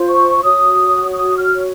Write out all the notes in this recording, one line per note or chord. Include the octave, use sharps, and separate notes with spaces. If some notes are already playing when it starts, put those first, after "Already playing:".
Already playing: F4 C5
C#6
F#4 C#5 D#6
D#6
F6